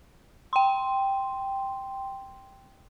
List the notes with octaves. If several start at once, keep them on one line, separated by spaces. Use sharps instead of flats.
G5 C6